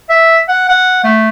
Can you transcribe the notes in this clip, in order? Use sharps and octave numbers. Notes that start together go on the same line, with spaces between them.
E5
F#5
F#5
A3